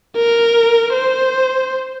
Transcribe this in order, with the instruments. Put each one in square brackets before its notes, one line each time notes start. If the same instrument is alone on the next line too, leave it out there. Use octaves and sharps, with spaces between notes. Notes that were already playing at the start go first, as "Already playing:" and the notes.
[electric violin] A#4
C5